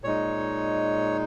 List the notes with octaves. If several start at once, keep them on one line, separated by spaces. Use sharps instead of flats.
A#2 G#3 D#4 C#5